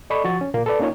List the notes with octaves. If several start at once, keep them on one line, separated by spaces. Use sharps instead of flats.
A4 D5 D#5 B5 C#6
F3 F#4 C#6 A6
C#4
A#2 A#3
A4 B4 D5
A#3 C#4 D#4 F4 C#5